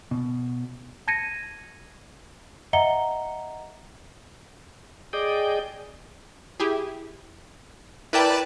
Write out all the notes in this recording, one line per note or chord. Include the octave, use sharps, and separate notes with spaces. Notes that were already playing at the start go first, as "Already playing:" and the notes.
B2
A5 G#6 A#6 C#7 D#7
D#5 E5 F#5 A#5 C#7 G7
G#4 D5 D#5 G5
E4 G4 G#4
E4 A#4 B4 D5 G5 A5